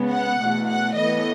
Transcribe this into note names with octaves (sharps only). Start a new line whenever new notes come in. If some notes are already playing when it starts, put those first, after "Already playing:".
Already playing: C#3 G#3 B3
F#5
E2 B2 A3
F#5
A2 E3 B3 D#5